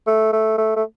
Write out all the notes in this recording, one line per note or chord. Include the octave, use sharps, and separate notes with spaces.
A3
A3
A3
A3